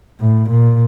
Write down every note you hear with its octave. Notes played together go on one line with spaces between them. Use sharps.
A2
A#2